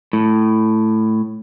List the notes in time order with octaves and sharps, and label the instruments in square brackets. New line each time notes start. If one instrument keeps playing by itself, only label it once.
[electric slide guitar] A2